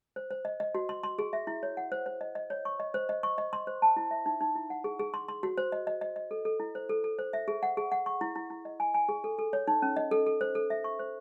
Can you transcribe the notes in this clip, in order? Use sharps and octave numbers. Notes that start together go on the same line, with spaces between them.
C5
C5
D#5
D#5
F#4
C6
C6
G#4
E5
E4
C#5
F#5
C5
C5
D#5
D#5
C#5
C#6
D#5
C5
D#5
C#6
D#5
C6
C5
A5
E4
E5
D#4
D#4
E4
F#5
G#4
G#4
C6
C6
F#4
C5
D#5
D#5
D#5
D#5
A4
A4
E4
C5
A4
A4
C5
E5
G#4
F#5
G#4
F#5
C#6
E4
E4
E4
D#5
G#5
G#5
G#4
A4
A4
C#5
D#4
C#4
D#5
A4
A4
C5
A4
E5
C#6
C5